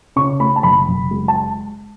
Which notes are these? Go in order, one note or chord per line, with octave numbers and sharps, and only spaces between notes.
C#3 C#6
A3 B5
A5
F#1 B5
F#1
G#3
A5